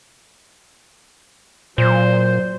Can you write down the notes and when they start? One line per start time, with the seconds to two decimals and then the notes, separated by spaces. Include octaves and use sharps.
1.78 A#2 F#3 C5